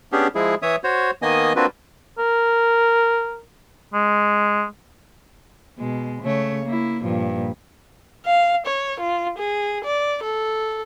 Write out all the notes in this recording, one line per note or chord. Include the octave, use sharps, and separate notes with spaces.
B3 C#4 D4 G4 G#4
F3 G#3 E4 G#4
E3 C#5 E5 D#6
F#4 C5 C#5
D#3 A#3 B3 D#5 G#5 D#6
A#3 C4 D4 F4 F#4 B4
A#4
G#3
B2 G#3
C#3 A3 C#5
A#3 E4
G2 A#2 F3
F5
C#5
F4
G#4
D5
A4